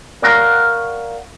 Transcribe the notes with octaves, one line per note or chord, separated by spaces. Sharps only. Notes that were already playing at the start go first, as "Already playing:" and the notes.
A#4 C#5 D5 F5 F#5 A#5